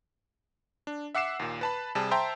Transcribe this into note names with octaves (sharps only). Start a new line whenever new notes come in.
D4
E5 F#5 D6 C7 E7
D#2 A#2
B4 A5 B5
C3 G3 G#4 A5
C5 E5 G5 A5 A#5 C6